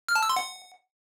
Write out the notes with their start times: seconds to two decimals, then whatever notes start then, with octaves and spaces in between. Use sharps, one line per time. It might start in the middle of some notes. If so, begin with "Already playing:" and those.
0.09 F6
0.16 A5
0.22 E6
0.29 C6
0.36 F#5